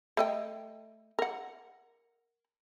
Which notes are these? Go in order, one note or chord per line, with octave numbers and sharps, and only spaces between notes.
A3 D#5 G5
A#4 F#5